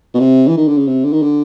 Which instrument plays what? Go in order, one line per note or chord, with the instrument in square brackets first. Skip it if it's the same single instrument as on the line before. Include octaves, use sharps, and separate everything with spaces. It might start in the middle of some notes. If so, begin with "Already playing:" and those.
[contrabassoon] B2
C3
E3
D#3
D3
C#3
C3
D3
D#3
D3